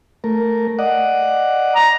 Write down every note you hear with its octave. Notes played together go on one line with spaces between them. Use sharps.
A3 A#4
D5 D#5 F#5
A#5